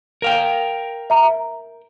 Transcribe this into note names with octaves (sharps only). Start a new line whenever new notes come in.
A#4 F5 G5
E5 A#5